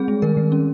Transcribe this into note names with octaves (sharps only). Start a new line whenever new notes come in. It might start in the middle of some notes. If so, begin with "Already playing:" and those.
Already playing: G3 C4 G#4
G#3
D#3 A#4
D#3
C#4